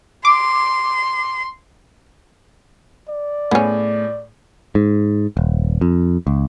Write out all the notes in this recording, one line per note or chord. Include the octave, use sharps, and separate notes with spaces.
C6 D6
D5
A2 B3 C#4 G#4
G#2
D#1
F2
C#2